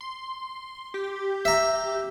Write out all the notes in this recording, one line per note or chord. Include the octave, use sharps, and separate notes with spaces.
C6
G4
E5 A#5